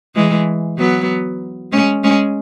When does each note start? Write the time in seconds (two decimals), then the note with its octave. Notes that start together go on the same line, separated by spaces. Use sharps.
0.15 E3 G#3
0.78 F#3 B3
1.72 G#3 C#4
2.03 G#3 C#4